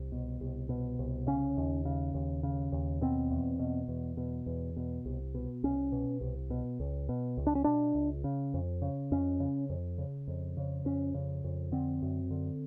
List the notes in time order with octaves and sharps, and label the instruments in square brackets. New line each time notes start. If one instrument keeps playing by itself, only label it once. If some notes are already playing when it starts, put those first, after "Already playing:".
Already playing: [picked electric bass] C2
B2
C2
B2
C2
C#3 C#4
D#2
C#3
D#2
C#3
D#2
B2 C4
E2
B2
E2
B2
E2
B2
C2
B2
C2 C#4
B2
C2
B2
C#2
B2
C#2
D4
C#4
B2 D4
C#2
C#3
F2
C#3
F2 C#4
C#3
F2
C#3
F2
C#3
F2 C#4
C#3
F2
D3 C4
F#2
D3